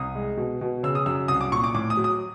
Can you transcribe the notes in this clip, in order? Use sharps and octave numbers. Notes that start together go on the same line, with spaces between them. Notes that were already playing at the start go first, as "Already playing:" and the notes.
Already playing: C2 D#6
G#3
B2
B2
C#3 E6
D#6
F#2 E6
C2 D#6
D6
A#2 C#6
D6
A2 D6
D#6
F#3
D#6